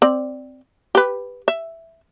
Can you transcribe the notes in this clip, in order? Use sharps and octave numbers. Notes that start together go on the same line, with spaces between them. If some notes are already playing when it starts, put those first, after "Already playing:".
C4 D5
G4 B4
E5